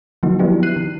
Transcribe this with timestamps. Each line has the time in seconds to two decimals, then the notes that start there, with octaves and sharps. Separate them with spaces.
0.23 D3 F3 F#3 A#3 D#4 F#4
0.39 F3 F#3 B3 D4 E4 G4
0.63 F#6 C7 D#7
0.76 D#3